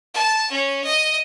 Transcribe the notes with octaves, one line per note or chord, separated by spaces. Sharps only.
A5
C#4
D#5